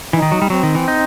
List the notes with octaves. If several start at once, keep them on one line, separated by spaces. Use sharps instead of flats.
E3 D#4
D#3
F#3
G3
F#3 C4
D#3
E3
D#4